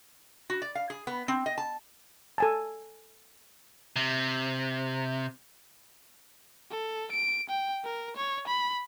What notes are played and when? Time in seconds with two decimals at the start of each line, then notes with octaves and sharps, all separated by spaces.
0.50 F#4
0.62 D5
0.75 F5
0.90 G#4
1.07 B3
1.28 C4
1.46 D#5
1.58 A5
2.38 A4 G#5 A5
3.96 C3
6.71 A4
7.12 D7
7.49 G5
7.85 A#4
8.17 C#5
8.47 B5